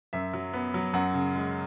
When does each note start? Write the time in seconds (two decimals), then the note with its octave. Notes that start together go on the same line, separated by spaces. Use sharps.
0.13 F#2 E5
0.33 F#3
0.53 B3
0.74 F#3
0.93 F#2 F#5
1.14 C#3
1.35 G#3